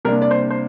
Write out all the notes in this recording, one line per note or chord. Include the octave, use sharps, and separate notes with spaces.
C3 G3 A#3 D4 A#4
D5
C5
C5